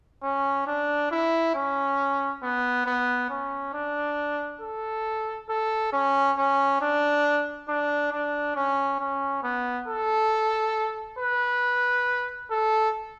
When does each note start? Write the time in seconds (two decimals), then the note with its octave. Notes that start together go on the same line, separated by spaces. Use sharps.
0.23 C#4
0.67 D4
1.11 E4
1.55 C#4
2.43 B3
2.86 B3
3.30 C#4
3.74 D4
4.61 A4
5.49 A4
5.93 C#4
6.37 C#4
6.81 D4
7.69 D4
8.12 D4
8.56 C#4
9.00 C#4
9.43 B3
9.88 A4
11.19 B4
12.51 A4